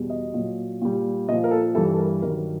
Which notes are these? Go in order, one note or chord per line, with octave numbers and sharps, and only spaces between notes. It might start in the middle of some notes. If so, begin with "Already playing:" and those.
Already playing: E2 B2 G3
D#5
A#2 F#3
A#2 G3
A#2 F3 D#5
A#4
A4
G2 E3 G3 A4
A4
A#4
G2 D#3 F#3 A#4
A#4